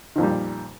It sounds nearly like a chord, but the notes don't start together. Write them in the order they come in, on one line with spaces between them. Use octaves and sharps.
D#3 F2 A#2 G3